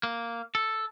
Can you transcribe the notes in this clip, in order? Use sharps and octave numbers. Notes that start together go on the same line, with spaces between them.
A#3
A4